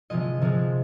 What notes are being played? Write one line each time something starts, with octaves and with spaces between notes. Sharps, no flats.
C3 F3 G#3 D#5
C3 F3 G#3